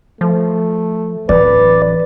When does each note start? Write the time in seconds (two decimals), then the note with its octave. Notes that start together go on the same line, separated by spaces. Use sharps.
0.21 F3 A3
1.29 D1 E3 B4 D5